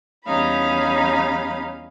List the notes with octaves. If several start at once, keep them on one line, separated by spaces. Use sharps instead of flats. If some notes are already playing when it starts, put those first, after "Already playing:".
E2 G3 C#4 D#4 F5 B5